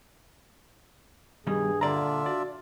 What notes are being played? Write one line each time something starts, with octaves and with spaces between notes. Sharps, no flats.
G2 B2 D#3 G3 G#4
A#2 D3 D4 F4 D5 E5 A#5
F#4 D5